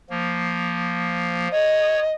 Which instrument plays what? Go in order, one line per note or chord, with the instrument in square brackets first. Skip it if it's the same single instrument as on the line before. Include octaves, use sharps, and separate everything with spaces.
[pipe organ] F3 A#3
[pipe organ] C#5 [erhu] D#5